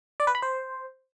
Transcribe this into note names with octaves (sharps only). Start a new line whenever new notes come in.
D5
B4
B5
C5